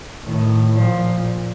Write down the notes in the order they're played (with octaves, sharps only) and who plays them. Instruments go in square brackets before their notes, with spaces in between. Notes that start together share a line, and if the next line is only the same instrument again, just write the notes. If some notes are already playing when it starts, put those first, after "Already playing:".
[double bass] A2 [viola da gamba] D#3
[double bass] A#2 [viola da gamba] F3